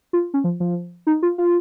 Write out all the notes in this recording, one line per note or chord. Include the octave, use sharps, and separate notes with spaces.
F4
C#4
F3
F3
D#4
F4
F4